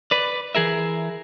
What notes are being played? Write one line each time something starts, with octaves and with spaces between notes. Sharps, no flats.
B4 D5
E3 G#4 A#4 E5